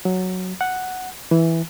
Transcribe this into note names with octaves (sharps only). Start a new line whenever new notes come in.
F#3
F#5
E3